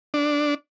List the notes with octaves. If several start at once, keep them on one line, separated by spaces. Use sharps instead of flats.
D4